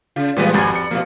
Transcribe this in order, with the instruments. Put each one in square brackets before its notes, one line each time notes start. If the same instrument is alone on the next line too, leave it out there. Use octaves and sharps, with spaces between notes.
[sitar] C#3 [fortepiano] F4
[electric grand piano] A#2 G3 G#3 [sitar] E3 F3 B3
[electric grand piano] G#1 A6 [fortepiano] F2 F#4 G#5 [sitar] G3
[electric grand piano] C#7
[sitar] B2 F3 [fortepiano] A#3 F4